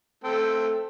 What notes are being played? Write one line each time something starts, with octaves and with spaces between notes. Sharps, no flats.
A3 C4 A4